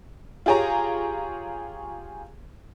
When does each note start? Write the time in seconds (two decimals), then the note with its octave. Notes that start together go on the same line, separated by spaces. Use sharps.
0.46 F4 G4 G#4 C#5 A#5